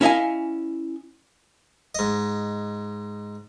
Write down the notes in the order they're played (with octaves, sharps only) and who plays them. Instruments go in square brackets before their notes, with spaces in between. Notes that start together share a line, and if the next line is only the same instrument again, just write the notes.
[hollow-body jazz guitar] C#4 E4 D#5 F5 G#5
[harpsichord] G#2 D#5